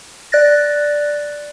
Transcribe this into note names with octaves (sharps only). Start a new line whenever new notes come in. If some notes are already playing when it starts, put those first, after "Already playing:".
D5 F#6 A6 A#6